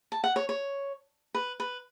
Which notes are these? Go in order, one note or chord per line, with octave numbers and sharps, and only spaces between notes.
A5
F#5
C#5
C#5
B4
B4